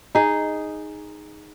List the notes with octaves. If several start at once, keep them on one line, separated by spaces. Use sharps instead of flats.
D#4 G#4